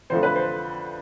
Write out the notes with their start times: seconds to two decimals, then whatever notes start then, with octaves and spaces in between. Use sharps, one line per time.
0.10 F2 D3 F3 A3 C5
0.23 B4
0.36 C5